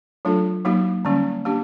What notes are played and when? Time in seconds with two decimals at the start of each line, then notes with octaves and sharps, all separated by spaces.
0.25 F#3 A3 D4 F4 A4
0.65 F#3 A#3 D#4 F#4
1.05 D3 G3 A#3 C#4
1.45 A#3 D4 G4